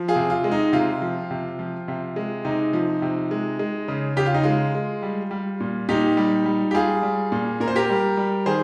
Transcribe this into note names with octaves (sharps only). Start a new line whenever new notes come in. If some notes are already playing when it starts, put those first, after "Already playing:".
Already playing: F3
F4 G#4
C3
F4
G#3
D#4
C3 F4
F3
C3
F3
C3
G#3
C3 D#4
F3
C3
G#3
G#3
C#3
C#3 G4
F4
D#4
G#3 F4
G#3
G3
G3
A#2
A#2 D#4 G4
G3
G3
G4
G3 F4 G#4
G3
A#2
A#2 A#4
C5
G4 A#4
G3
G3
D#3 G#4 C5